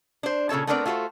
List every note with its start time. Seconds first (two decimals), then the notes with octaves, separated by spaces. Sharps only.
0.23 D4 C5
0.49 A#2 C#3 A4 C#5 A5
0.67 A3 B3 C4 D4 A#4 D5
0.86 A3 F4 F#4 A4 C5